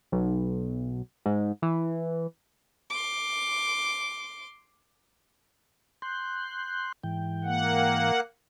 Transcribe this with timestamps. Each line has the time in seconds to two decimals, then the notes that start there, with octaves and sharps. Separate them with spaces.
0.12 B1
1.26 G#2
1.62 E3
2.90 C6 D6
6.02 C6 F#6 G6
7.04 G#2 E3 G5
7.44 A#3 F#5